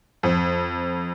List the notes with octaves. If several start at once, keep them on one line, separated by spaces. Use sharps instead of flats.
F2